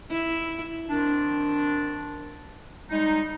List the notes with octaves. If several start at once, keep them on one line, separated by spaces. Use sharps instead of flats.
E4
D#3 C4 D4
G3 G#3 D#4